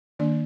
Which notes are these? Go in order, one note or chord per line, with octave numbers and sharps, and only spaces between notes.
D#3 A#3 D4 D5